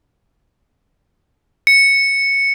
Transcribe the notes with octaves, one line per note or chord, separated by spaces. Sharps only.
C#7